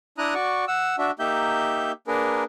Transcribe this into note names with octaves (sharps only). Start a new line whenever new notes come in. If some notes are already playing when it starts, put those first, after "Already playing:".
D4 E4 A#5 D#6 F#6
F#4 D5 C#6
F#5 E6
D4 F#4 E5
A#3 D#4 G4 E5 G6
A#3 D4 G#4 A#4 B4